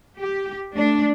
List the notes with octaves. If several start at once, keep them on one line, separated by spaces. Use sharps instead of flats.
G4
A3 D4